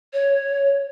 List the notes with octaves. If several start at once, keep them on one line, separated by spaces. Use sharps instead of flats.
C#5